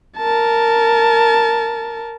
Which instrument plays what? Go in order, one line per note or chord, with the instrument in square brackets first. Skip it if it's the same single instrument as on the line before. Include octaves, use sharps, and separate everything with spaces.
[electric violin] A#4 A5